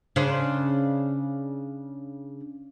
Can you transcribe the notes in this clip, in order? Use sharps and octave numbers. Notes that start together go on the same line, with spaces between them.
C#3 D4 C5